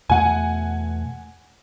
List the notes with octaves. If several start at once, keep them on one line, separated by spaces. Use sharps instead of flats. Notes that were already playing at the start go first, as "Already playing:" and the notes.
E2 B2 A3 F#5 G#5